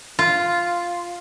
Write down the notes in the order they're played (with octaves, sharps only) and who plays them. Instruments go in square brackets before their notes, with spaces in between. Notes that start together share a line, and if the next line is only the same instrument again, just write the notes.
[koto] F4